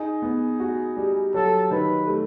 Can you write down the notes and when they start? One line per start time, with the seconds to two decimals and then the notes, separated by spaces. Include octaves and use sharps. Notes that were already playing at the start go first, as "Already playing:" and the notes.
Already playing: D#4 G#4
0.22 B3
0.60 F#4
0.97 G3
1.34 F#3 A4
1.71 D#3 B4
2.07 A3